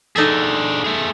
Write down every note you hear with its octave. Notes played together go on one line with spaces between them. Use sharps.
D4 D#4 G#4 A4 E5
A3 G#4